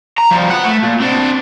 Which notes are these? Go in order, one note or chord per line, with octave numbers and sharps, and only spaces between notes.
A#5
F3 G3
B3 F#5
A3
A#2
C4 D4